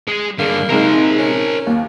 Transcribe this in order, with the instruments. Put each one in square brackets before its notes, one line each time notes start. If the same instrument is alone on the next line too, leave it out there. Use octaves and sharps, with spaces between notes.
[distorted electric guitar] G#3 G#4
[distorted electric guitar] G2 D3 [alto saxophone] A#3 [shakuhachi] G#4
[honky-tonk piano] C3 G#3 [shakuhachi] D#4 [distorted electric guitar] A#4 C5
[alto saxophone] C#4
[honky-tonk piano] D#2 [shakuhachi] A#3